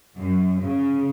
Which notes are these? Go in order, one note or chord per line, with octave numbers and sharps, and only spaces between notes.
F#2
C#3